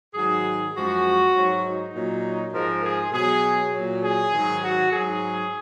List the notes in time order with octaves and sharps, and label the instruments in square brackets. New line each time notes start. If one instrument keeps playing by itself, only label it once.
[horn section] G#2 D#3 F#3 G#4
F#2 F3 G#3 F#4
G#2 F#3
D#4
A#2 F#3
G#2 F3 G#3 A#4
G#4
B2 F#3 G#4
A#2 F#3
G#4
G#2 D#3 F#3
F#4
G#2 F#3 G#4